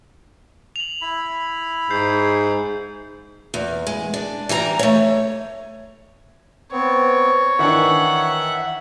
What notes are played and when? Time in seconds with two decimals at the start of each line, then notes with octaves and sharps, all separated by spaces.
0.76 F7 F#7
1.01 E4 B5
1.90 G#2 G6 C7
3.54 E2
3.87 G#3
4.14 D4
4.49 E3 G3 A4 A#5
4.79 A3 C#5
6.72 B3 C4 C#5
7.59 D#3 E3 D4 E5 F#5